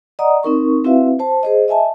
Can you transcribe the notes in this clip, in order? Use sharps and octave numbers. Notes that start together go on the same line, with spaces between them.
D5 D#5 F#5 A#5 D#6
C4 D#4 A#4 C#6
C4 E4 F#4 B4 E5 F5
C5 A5
G#4 C5 D#5
D#5 E5 G#5 A5